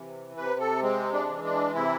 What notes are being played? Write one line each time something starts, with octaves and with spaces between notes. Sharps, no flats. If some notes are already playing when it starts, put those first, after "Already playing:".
Already playing: C3 E3
C3 B4
A4
G#3 C4
D4
E3
D4
C3 E4